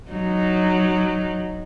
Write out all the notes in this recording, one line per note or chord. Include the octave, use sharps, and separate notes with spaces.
F#3 D#4